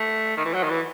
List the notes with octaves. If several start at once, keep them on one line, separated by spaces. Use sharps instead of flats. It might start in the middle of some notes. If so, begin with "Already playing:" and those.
Already playing: A3
D#3
E3
F#3
D#3
E3